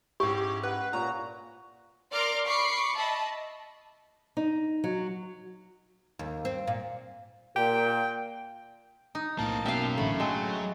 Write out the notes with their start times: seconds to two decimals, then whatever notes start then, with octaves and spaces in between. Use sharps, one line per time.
0.20 G#2 C#4 E4 G4 C#6
0.63 B4 F#5
0.93 A#2 C#5 A#5
2.11 A#4 D5 C6 D6 F6
2.45 B5 C#6 D6 C7 C#7
2.94 D#5 E5 A5 B5
4.37 D#4
4.84 F#3
6.19 D#2
6.45 C4
6.67 A#2
7.56 A#2 G5
9.15 D#4
9.39 B1 A2 A#3 C4 A5
9.66 B2 F#3 A#3 C#4 E5 F5 G5
9.97 A1 D3 A3 C#5 B5
10.20 F#3 G#3 A4 D#5 G5